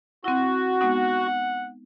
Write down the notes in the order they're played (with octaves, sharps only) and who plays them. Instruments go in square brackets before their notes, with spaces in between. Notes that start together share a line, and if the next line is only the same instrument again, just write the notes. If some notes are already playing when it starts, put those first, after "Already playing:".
[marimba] C4 E4 [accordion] F#4
[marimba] G#3 B3 D#4 [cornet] F#5